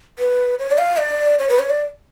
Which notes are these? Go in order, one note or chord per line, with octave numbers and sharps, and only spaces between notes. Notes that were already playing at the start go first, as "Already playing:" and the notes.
B4
C#5
D5
F5
D5
C#5
B4
C#5
D5